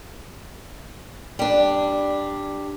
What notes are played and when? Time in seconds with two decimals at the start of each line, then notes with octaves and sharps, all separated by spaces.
1.39 G3 D4